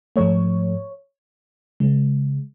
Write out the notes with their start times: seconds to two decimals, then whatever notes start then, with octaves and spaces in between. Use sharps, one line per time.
0.16 G#2 F3 A3 C#5
1.80 C#3 G#3